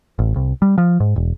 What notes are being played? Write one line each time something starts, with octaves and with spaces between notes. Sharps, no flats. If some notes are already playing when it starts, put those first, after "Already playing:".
A1
C2
G3
F3
G#2
E1